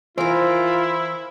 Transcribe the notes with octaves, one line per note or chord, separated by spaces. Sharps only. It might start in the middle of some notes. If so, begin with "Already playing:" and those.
E3 E4 F4 A#4 C5